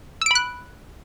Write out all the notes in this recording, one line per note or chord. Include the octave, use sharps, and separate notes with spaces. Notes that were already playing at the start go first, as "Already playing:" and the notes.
B5 E6 F#6 D7